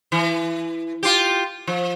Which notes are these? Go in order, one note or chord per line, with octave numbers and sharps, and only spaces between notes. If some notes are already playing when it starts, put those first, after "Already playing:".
E3
F4 G4
F3